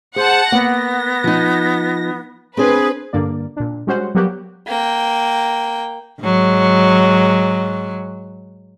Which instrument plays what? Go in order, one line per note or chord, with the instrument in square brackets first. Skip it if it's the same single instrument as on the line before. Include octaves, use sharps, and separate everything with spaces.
[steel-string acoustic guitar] G#4 [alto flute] C5 [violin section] F#5 A5
[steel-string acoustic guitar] A#3 F#5 [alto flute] B3 [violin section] A#6
[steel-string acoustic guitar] F3 D#4
[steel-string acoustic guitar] C4 D4 C5 [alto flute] G#4 [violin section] B4
[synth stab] G2 D3 A#3 D5
A#2 D4
G3 G#3 C#4 F#4 C5 F#5
F#3 G3 A#3 B3 F#4 G4
[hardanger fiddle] A#3 G5
[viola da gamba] G#2 F#3